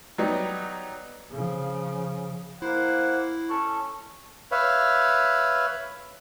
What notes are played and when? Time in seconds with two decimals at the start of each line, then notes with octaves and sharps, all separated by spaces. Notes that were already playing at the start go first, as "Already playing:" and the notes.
0.18 F#3 G3 B3 D#4
1.31 C#3 F3
2.62 A#3 E4 C5 F#5
3.50 C#4 A4 C#6
4.52 B4 C#5 E5 F5